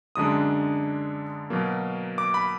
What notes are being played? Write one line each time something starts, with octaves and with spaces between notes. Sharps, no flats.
F#2 D3 G#3 D4 D#6
B2 F#3 A#3
D6
B5